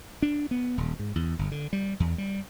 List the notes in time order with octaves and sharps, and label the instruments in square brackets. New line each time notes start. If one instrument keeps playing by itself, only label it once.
[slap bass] D4
B3
D#1
G#2
E2
G1
D3
G3
E2
G3